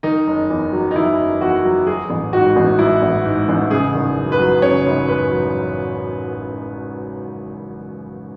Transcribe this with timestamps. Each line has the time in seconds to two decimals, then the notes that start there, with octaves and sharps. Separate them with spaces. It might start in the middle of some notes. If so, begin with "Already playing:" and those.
0.03 D#3 D#4
0.27 F#1
0.50 E2
0.73 F#3
0.91 D#4
0.95 D#3 E4
1.19 F#1
1.41 E2 F#4
1.64 F#3
1.87 F#3 G#4
2.10 A1
2.33 G#2 F#4
2.56 A1
2.79 F#3 E4
3.02 A1
3.25 G#2
3.49 A1
3.71 C#3 G#4
3.95 G#1
4.17 F#2
4.32 B4
4.40 F#3
4.62 C#3 C#5
4.86 G#1
5.08 F#2 B4
5.32 F#3